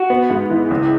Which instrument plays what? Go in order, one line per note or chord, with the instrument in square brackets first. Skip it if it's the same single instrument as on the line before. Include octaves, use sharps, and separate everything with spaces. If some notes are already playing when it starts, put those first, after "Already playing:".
Already playing: [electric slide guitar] F#4
[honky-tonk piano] B3
G#2
E3
C#2